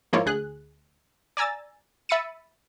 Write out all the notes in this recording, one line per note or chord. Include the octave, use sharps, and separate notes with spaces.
G#2 F3 A#3 E4 F4 C#5
D2 G#4 F#6
D5 G#5 A#5 E6 A6
E5 B5 E6 A6 C#7 D#7